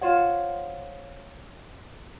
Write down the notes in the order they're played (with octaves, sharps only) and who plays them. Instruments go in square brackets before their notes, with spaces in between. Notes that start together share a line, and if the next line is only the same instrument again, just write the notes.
[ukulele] F4 C5 C#5 F#5